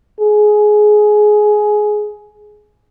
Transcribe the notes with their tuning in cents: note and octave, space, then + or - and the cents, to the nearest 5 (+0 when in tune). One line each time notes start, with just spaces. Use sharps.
G#4 +15